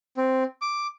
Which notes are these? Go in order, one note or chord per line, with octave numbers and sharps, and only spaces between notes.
C4
D6